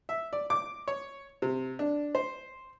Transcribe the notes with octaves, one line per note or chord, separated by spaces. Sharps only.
E5
D5
D6
C#5
C3
D4
C5